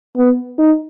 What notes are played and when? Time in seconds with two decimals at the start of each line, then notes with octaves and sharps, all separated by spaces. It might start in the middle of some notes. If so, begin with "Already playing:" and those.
0.17 B3
0.58 D#4